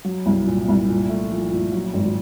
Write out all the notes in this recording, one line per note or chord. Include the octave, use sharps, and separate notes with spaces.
F#3
C2
A#2
C2
A#2
A3
F3
A#2
F#3
G#1